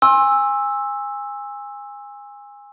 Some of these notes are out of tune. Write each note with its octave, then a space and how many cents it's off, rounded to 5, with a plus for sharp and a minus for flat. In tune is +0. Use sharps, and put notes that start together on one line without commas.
G#5 -25 C6 +30 E6 +0